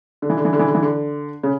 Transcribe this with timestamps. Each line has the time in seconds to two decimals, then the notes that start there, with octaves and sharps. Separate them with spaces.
0.22 D3
0.30 E3
0.37 D3
0.45 E3
0.53 D3
0.59 E3
0.68 D3
0.75 E3
0.82 D3
1.43 C#3